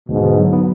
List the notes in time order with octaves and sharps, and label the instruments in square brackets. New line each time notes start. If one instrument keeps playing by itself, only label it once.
[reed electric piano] D2 [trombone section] G#2 B2
[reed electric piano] D3
F#3
B3